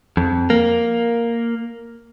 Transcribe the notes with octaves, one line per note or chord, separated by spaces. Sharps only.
F2
A#3